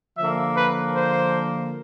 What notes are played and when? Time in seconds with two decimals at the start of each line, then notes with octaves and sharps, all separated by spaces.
0.18 D3 F3 A#3 E5
0.55 B4
0.94 C5